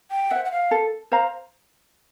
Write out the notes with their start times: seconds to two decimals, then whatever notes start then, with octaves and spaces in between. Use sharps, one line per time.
0.11 G5
0.31 C5 E5 F#5
0.45 F#5
0.52 F5
0.71 A4
1.12 C5 F5 A#5